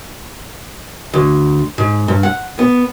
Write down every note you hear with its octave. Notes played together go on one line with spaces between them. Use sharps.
D2
G#2
G2
F#5
B3